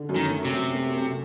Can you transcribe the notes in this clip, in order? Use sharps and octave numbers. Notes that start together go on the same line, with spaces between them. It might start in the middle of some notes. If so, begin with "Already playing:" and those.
Already playing: D3
F#2
D#3
A3
C3
F#2
A3
A3